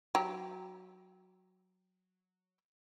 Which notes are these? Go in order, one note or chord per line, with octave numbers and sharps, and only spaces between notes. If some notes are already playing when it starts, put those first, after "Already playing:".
F#3 G4